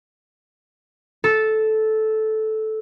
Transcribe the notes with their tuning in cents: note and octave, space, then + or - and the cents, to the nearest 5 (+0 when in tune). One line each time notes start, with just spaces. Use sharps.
A4 -10